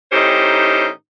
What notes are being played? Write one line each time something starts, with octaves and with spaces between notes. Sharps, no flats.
A2 D#3 C#4 D#4 G4 C5